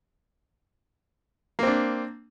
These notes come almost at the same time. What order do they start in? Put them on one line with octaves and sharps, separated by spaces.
A#3 C4 D4